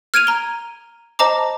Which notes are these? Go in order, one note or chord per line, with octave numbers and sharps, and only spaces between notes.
F6 G#6 D7 D#7 F7
A#5 G7
C5 D#5 A5 A#5 D6